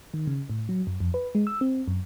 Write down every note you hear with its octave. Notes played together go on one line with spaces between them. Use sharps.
D#3
C#3
A2
F#3
F#2
F2
B4
G#3
E6
C4
F#2